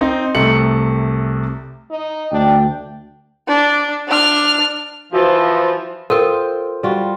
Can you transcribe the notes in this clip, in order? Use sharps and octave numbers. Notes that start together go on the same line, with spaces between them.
C4 D#4
C2 C3 A3 C#7 F#7
D#4
D2 D4 G5
D4
D4 F6
E3 F3 F#4 C5
F4 A4 A#4 C5 G5
G3 F4 F#4